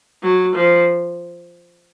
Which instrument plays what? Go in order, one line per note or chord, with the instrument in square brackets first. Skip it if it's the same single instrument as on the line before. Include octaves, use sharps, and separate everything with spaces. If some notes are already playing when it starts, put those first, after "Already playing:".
[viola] F#3
F3